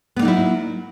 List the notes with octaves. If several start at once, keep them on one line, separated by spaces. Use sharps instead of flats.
F#3 A#3 B3 D#4 E4